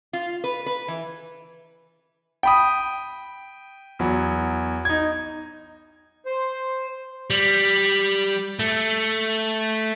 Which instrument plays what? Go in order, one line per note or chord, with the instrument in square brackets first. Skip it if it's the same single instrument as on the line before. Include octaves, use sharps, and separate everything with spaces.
[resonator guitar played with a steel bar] F4
B4
B4
E3
[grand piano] G5 B5 D#6
E2 F#3
D#4 G#6
[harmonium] C5
[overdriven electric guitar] G3
A3